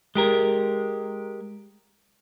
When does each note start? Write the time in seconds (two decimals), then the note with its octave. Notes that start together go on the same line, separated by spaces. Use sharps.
0.15 G#3 G4 A#4